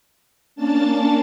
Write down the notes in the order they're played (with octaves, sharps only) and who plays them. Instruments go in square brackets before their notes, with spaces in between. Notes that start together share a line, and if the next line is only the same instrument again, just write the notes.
[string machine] A#3 C#4 D4 A5 A6